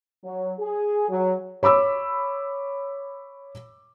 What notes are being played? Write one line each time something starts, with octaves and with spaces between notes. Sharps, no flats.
F#3
G#4
F#3
C#5 B5 D6 E6